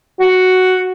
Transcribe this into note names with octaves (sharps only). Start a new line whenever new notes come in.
F#4